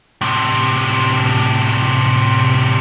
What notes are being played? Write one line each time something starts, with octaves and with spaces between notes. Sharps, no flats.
A2 C3